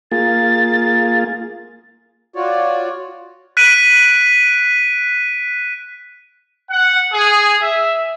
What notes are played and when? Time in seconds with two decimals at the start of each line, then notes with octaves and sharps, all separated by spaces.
0.11 A#3 F4 G#4 A6
2.34 F4 F#4 C#5 D5
3.57 F#6 B6 D7 D#7
6.70 F#5
7.12 G#4
7.61 E5